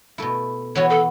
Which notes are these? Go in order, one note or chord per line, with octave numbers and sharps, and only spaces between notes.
B2 A3 E4
E3 B3 F#4 C#5
A4